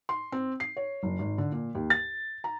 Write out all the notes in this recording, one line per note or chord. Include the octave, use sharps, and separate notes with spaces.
C6
C4
C7
C#5
F#1
G#1
D3
A#2
D#2
A6
A#5